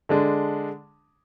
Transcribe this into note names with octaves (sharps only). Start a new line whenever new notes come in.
D3 G#3 D4